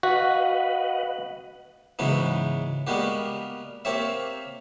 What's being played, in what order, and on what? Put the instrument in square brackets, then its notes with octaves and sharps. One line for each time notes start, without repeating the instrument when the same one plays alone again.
[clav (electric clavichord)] F#4 [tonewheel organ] B4 D#5 F#5 [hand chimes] F5
[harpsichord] G#2 C#3 E3 F#3 B3
G3 G#3 A#3 B3 F#4 G4
A#3 C4 G4 C#5 E5